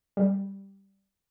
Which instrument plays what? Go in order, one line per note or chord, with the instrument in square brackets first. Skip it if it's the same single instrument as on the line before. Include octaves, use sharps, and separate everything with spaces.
[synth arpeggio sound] G3